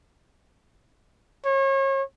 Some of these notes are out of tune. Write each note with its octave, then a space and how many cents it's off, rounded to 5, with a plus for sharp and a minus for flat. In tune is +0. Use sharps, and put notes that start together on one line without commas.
C#5 -35